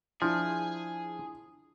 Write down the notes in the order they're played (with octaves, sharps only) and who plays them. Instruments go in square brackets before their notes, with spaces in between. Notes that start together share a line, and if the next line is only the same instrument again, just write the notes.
[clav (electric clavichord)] F3 [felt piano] D4 E4 [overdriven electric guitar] G#4